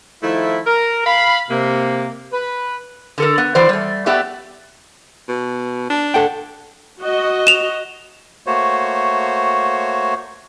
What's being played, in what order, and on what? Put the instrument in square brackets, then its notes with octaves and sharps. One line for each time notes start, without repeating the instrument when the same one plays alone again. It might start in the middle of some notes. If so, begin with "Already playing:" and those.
[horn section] D#3 F3 A3 E4
A#4
F5 B5
C3 A#3
B4
[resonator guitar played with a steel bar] D3 A4 A#4
B3
A2 E3 F#4 C5 D5
G3 A3
A3 B3 G4 D5 E5
[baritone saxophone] B2
D4
[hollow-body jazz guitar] A4 F#5 G5
[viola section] F#4 D#5
[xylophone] E7 F7
[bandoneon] A3 A#3 F#4 C5 C#5